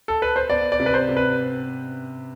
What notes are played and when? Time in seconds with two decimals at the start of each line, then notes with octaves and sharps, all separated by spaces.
0.08 A4
0.22 B4
0.36 C5
0.50 B3 D5
0.72 D5
0.80 C3
0.86 B4
0.94 C5
1.09 C3
1.17 B4